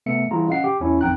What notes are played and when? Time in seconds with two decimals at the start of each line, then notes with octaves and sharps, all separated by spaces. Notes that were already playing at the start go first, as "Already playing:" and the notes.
0.06 C3 A3 B3 E5 C#7
0.31 E3 G3 E4 F4 G#4 A#5
0.48 C#4 D#5 F5 F#5 C7
0.64 G4
0.80 E2 C#4 E4
1.01 A1 F2 D#4 G5 A#5 F#6